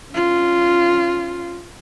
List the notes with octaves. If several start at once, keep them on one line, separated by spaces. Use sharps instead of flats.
C#4 F4